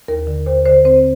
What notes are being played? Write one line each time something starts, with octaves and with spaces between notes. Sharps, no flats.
D#2 A#4
D3
D#2 C5
D3 C5
C4 C5